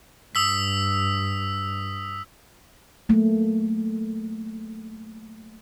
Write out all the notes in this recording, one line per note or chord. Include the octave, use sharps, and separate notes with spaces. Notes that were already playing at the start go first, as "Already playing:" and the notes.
G2 D#6 E6 B6
F#3 A3 A#3